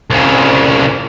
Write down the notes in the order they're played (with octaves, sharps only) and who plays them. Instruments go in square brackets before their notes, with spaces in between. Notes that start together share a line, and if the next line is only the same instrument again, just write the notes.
[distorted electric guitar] C2 C#3